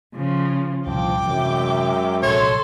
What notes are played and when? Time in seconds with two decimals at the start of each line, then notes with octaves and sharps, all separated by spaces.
0.13 C#3 F3
0.86 C2 G2 A#2 F3 G5 D6
1.25 F#2 C3 E3 F#3 G#3 E5
2.23 A#1 C3 F#3 A4 C#5 C6